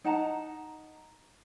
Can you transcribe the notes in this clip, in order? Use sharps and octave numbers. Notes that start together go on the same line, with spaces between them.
D#4 F#5 A5 A#5